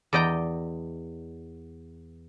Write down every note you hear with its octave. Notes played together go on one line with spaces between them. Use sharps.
E2 D5 D#5 G5 A#5